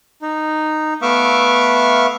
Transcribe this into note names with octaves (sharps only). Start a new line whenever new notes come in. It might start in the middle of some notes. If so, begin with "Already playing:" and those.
D#4
A3 B3 E5 F5 C#6 D6